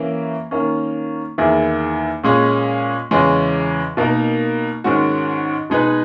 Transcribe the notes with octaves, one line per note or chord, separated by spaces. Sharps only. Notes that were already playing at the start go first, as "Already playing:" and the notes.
Already playing: E3 A#3 C#4 E4
D#3 A#3 C#4
E2 D#3 A#3 E4 G#4
A#2 G#3 C#4 G#4
E2 C#3 E3 G#3 C#4
B2 A#3 D#4 A#4
G#2 D#3 G#3 C#4 F#4
B2 G#3 D#4 G#4 B4